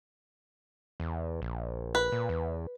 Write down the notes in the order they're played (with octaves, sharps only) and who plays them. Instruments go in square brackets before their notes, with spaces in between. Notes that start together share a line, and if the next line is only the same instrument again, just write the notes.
[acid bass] E2
A#1
[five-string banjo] B4
[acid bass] A#2
E2